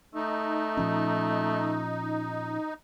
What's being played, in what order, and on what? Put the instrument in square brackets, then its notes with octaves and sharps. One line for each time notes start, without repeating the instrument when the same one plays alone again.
[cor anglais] A3 [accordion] D#4
[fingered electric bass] A#2 F3 C#4